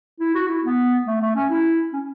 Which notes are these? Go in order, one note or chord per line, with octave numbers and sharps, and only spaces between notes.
E4
F#4
E4
B3
A3
A3
C#4
E4
C#4